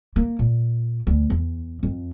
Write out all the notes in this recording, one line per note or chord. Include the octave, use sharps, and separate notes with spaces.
A#3
A#2
D2
E2
F2